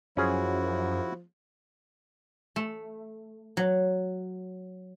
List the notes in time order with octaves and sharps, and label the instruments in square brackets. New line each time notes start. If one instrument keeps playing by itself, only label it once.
[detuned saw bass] F#2 [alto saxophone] F3 [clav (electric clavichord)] C#4 G#4 [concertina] E4 F#4
[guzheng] A3
F#3